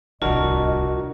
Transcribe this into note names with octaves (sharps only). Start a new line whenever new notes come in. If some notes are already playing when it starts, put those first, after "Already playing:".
D1 C2 D4 F4 F#4 A#4 D#5